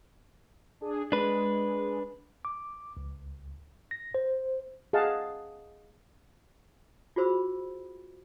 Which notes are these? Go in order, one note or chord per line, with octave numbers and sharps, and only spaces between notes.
D4 G#4
G#3 D4 B4
D6
C#2
A#6
C5
G#4 D#5 F5 F#5 A5
F4 F#4 G#4 C5 B5 E6